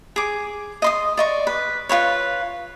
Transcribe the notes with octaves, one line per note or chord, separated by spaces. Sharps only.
G#4 D6
D#5 C6 D#6
D5 D#5 C#6
B4
F4 F#4 B4 C#5